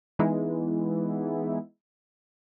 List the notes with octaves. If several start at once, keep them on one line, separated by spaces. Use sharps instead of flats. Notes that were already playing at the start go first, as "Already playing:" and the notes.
E3 G#3 B3 D#4 E4